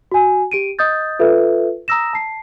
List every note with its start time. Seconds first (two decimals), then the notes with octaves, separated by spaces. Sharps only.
0.12 F#4 G#5
0.52 G4 D7 D#7
0.79 D#5 D#6 G6 A6
1.19 F4 A4 B4 E5
1.88 A#5 D#6 E6 A#6 E7
2.13 A5 C7